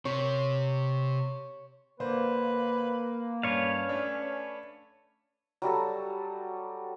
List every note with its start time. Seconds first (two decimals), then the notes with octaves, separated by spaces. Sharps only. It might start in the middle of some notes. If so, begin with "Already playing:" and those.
0.05 C3 C#5
2.00 D3 A#3 B4 C5
3.43 G2 C#4 B4 C#5 F5
3.89 A3 D4
5.62 F#3 G3 F#4 A4